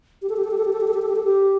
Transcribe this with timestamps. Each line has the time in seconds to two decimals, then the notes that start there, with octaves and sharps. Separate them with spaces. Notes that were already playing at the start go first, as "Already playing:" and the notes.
0.22 G4
0.29 A4
0.37 G4
0.44 A4
0.51 G4
0.58 A4
0.65 G4
0.73 A4
0.81 G4
0.88 A4
0.94 G4
1.02 A4
1.09 G4
1.16 A4
1.23 G4